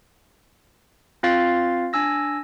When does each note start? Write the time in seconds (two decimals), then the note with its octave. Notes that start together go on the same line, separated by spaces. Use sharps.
1.23 C4 F4 F5 A6
1.93 D4 G#5 E6 A#6